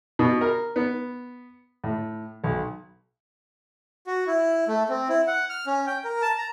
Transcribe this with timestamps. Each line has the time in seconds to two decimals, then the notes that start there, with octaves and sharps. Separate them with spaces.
0.19 B2
0.41 A#4
0.76 B3
1.84 A2
2.44 B1
4.07 F#4
4.27 E4
4.68 A3
4.89 C4
5.09 E4
5.27 F#5
5.49 F6
5.67 C#4
5.87 G5
6.04 A#4
6.22 A5
6.38 A#5